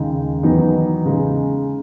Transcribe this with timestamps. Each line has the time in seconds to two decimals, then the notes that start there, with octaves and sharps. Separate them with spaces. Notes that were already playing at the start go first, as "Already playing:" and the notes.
Already playing: D#2 C#3 G#3 D#4
0.43 E2 D#3 F#3 B3 D#4
1.05 C#3 G#3 D#4